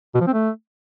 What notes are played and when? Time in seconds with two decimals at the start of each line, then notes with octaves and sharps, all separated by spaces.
0.15 B2
0.21 F3
0.27 C4
0.33 A3